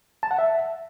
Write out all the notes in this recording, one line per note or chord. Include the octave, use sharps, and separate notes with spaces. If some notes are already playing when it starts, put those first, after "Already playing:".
A5
F#5
E5